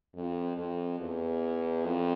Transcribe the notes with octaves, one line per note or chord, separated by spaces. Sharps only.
F2
F2
E2
F2